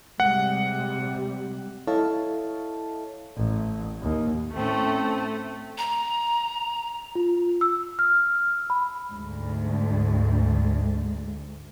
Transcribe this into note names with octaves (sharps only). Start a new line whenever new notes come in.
C3 G3 G#3 F#5
E4 A4 C#5 D#5 F5 A5
A1
D#2
A2 A3 C4 C#4
A#5
F4
E6
F6
B5
D2 G#2